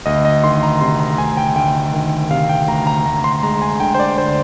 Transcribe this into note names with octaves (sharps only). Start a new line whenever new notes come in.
D2 D#5
D#5
D#3 C6
A#5
C3 C6
A#5
D2 G#5
G5
D2 G5
D#3
C3 F5
G5
D2 A#5
A#5
D2 A#5
C6
G#3 A#5
G#5
D3 G5
C5
D5
D2 C5